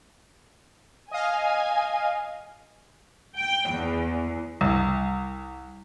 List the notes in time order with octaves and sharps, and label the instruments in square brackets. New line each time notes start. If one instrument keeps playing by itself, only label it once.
[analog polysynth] D#5 F5 [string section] G#5
[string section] G5
E2
[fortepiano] C2